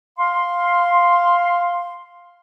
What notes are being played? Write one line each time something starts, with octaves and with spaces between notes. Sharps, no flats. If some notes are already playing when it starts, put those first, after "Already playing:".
F5 C6